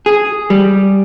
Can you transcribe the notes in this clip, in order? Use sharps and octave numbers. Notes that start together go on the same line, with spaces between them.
G#4
G3